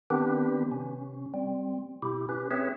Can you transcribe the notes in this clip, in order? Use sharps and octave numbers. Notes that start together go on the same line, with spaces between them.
D#3 B3 C4 D4 G4 B4
C3 C#4
G3 C4
B2 E4 G4
C#4 G4 B4
C4 G#4 B4 C#5 E5